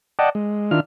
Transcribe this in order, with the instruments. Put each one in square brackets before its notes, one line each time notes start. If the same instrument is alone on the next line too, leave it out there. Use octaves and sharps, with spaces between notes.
[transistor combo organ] D5 D#5 F#5 G5 A5
G#3
D#3 D4 E4 F4 F6